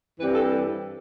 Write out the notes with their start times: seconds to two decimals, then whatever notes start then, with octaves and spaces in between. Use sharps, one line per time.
0.18 G2 E3 G3 C4 B4
0.34 A4